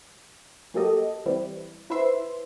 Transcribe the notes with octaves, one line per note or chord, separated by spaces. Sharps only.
F#3 A#3 G4 A4 D#5
E3 G3 C4 E4
E4 B4 C5 E5 C6